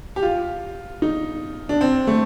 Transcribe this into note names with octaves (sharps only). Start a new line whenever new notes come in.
G4
F4
D#4
D4
C4
A3